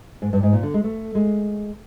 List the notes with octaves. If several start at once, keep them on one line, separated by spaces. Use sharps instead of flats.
G#2
G2
G#2
A#2
D3
G#3
A3
G#3